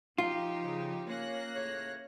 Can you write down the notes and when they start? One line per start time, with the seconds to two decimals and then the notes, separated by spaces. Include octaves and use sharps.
0.18 F3 D#4 F4 G4
0.63 C#3
1.08 A#3 C#4 C#5 F#6 A#6
1.55 A2 C#3 C#5